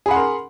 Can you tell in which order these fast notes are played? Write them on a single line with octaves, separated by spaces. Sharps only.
G#4 B5 F#5 C6 A#4